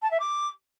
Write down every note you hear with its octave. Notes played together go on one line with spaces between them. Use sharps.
A5
E5
D6